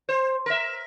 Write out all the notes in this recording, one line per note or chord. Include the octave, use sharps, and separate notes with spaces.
C5
A#4 E5